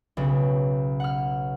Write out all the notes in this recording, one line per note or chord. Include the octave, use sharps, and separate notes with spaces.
B1 C#3
F#5 F6